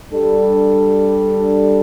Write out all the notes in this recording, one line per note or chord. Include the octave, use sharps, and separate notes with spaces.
G3 D4 A4